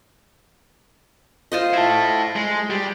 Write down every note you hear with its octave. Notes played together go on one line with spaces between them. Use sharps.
F4 C5 D#5
E4 A4
G#3
G3